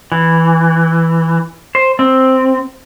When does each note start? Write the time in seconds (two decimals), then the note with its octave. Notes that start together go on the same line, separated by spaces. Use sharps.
0.12 E3
1.75 C5
1.99 C4